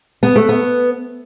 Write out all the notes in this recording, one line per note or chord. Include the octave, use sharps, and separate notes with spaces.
B3
A3
B3